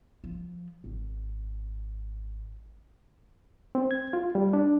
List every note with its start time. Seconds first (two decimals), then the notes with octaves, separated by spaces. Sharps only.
0.24 F3
0.84 G#1
3.75 C4
3.91 G#6
4.13 F4
4.35 G3
4.53 D4